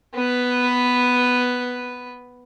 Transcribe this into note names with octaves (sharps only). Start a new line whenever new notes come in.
B3 B4